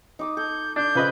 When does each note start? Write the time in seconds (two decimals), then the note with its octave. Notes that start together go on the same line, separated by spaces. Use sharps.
0.19 D#4 D6 D#6
0.37 A4 G6
0.76 D4 G6
0.95 C#3 F3 B4 D#5 D#6